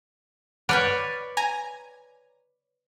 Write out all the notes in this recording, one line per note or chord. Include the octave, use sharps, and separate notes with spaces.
B4 C#5 D5 F#5 F6 G6
G#5 A#5